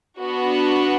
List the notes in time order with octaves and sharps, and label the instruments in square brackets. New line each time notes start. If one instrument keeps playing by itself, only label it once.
[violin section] B3 D4 F#4